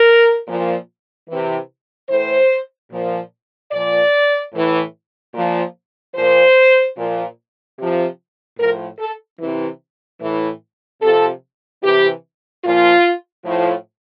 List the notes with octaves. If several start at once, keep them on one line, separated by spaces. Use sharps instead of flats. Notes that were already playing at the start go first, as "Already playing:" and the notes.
Already playing: A#4
A#2 F3
C3 E3
A2 E3 C5
A#2 F3
A#2 F3 D5
A2 E3
A#2 F3
A#2 F3 C5
A#2 F3
C3 F3
A2 F3 A#4
A4
C3 E3
A2 E3
C3 F3 A4
C3 E3 G4
A#2 F3 F4
A2 F3